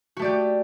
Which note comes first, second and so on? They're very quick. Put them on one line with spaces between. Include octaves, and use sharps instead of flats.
F#4 A3 D5 G4